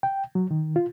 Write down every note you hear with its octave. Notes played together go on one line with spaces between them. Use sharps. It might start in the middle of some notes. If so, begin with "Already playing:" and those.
G5
F#3
D#3
F4